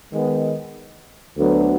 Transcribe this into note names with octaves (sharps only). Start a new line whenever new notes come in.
D#3 G#3 B3
D2 D3 F#3 B3